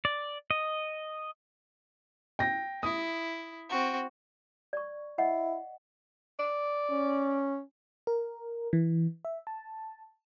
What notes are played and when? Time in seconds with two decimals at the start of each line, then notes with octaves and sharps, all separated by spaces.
0.05 D5
0.51 D#5
2.39 G5 A#6
2.83 E4 D#6
3.69 C4 F#4
4.73 D5 C#6
5.18 E4 D#5 F#5
6.39 D5
6.90 C#4
8.07 A#4
8.73 E3
9.25 E5
9.47 A5